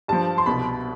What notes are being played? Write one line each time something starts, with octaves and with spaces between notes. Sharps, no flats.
G2 F3 A5
C6
C2 B2 B5